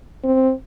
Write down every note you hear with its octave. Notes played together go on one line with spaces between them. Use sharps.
C4